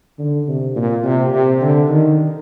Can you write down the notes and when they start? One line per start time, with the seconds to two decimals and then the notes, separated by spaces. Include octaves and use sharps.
0.19 D3
0.47 C3
0.76 A#2
1.04 C3
1.32 C3
1.61 D3
1.88 D#3